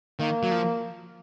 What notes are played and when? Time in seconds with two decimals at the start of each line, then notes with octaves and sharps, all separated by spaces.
0.19 D#3 A#3
0.43 F#3
0.51 F3